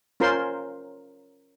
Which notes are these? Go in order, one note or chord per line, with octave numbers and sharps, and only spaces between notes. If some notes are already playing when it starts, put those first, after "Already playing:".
C#4 F4 A#4 C5 C6